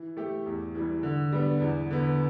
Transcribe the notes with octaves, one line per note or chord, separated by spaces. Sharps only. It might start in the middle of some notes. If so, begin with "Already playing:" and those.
Already playing: E3
A3 G4
E2
E3 G3
D3
G3 B3 D4
E2
D3 B3